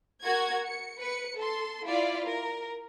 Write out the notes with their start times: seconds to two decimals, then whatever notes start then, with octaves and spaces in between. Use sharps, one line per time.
0.23 F#4 A#4 G#6
0.65 C#7
0.99 B4 C#7
1.37 A4 C6
1.86 E4 F4 D5 F5
2.26 A#4